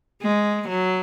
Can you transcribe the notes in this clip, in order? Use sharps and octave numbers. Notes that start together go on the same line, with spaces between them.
G#3
F#3